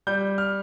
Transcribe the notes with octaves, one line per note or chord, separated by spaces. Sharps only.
G3 G6
F6